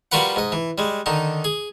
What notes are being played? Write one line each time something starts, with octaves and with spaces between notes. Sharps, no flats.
G3 F4 F#4 A#4 B4 F#5
G#2 D#5
E3
G3 G#3
D3 D#3 D#4
G#4